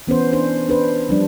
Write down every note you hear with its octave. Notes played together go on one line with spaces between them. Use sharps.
E3 B3 C#4 C5
D4 C5
D4 B4 C5
F3 G3 D4